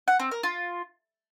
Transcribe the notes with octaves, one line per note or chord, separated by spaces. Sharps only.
F#5
C4
A#4
F4